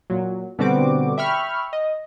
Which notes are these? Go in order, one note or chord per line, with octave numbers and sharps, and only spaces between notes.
A#2 F#3
B2 D3 G3 C4 F#4 D6
E5 G5 B5 C#6 F6
D#5